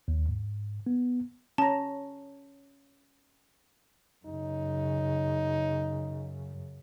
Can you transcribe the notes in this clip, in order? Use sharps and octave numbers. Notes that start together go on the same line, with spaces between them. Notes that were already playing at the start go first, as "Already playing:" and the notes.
D#2
G#2
B3
C#4 A5 A#5
F#2 C#3 D#4